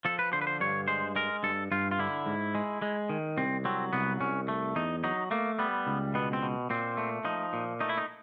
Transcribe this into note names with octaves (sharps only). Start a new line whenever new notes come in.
F3 A4
B4
D3 C5
B4
C5
G2 C#5
G#3 C5
G#3 A#4
G2 A4
G2 F4
F4
D3 E4
G#2
G#3
G#3
D#3
C2 C4
F#3 C4
C2 B3
C2 C#4
A3
E2 D#4
F#3 D#4
A3 A#3
G3 B3
C#2
B2 B3
C4
B2
A#2 C4
A3
F3 D#4
A#2
A3 D#4
E4
D#4